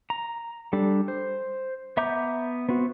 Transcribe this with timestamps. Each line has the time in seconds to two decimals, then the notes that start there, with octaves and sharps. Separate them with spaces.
0.10 A#5
0.73 G3 D4 A4
1.08 C5
1.97 B3 E5 A#5 D6 G6
2.69 B3 C4 F#4